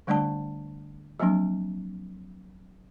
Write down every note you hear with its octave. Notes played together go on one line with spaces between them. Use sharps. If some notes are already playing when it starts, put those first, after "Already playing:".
D3 G3 A3 D4 D5 A5
F3 F#3 A#3 C4 D4